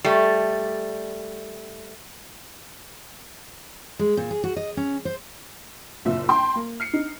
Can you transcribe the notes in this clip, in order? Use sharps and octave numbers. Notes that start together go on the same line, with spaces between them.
G3 A3
G#3
A#2
G#4
F#4
D#5
C#4
C5
F#1 A#2 F4 E5 E6
G5 A5 B5 C6
A#3
F6 C7 C#7
D#4